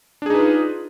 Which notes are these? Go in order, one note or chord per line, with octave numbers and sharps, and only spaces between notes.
D4 D#4 F4 G#4 B4